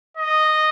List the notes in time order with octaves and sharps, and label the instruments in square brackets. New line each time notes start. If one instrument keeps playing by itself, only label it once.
[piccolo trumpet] D#5